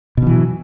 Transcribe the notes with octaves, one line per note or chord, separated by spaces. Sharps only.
B2 D3 E3 F#3